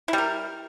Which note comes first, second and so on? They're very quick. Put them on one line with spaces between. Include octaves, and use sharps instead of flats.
E4 G3 A#4